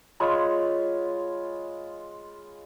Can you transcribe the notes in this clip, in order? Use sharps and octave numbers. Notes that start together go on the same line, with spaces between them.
G#3 F4 C#5 B5